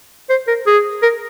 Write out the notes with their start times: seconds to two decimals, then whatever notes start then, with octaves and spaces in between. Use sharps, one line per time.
0.30 C5
0.48 A#4
0.67 G#4
1.02 A#4